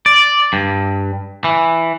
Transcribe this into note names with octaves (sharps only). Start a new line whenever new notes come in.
D5
G2
E3